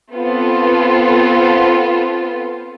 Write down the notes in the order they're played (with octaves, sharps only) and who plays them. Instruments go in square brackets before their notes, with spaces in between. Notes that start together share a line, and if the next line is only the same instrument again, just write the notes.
[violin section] B3 C4 F4 A4 B4